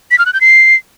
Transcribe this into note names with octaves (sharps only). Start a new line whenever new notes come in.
B6
F6
F#6
G6
C7